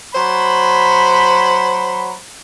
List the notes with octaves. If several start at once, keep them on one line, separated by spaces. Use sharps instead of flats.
F#3 C5 B5